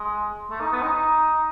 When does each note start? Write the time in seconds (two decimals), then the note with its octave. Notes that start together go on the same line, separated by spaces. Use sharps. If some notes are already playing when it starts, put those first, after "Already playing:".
Already playing: G#3
0.51 A3
0.61 D#4
0.72 B3
0.82 D#4
0.92 D#4